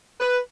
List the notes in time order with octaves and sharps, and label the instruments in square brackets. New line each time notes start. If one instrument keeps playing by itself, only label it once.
[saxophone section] B4